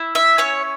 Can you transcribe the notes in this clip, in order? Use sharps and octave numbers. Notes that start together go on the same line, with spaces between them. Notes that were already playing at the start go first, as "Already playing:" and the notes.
Already playing: E4
E5
C#4 C#5